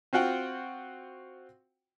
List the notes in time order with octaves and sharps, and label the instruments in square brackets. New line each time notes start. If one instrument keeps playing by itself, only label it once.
[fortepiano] C4 F4 F#4 F#5 G5